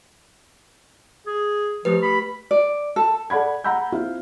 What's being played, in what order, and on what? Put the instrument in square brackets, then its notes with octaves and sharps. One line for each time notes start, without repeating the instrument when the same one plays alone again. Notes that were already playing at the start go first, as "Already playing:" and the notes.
[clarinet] G#4
[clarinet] F3 [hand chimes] A3 G4 B4
[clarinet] B5
[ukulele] D5
A4
[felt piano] A4 D5 F#5 B5 G#6
F#5 A#5 B5 E6 G6
C4 E4 F4